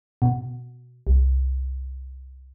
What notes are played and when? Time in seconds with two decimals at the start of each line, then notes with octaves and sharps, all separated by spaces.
0.22 B2
1.07 C2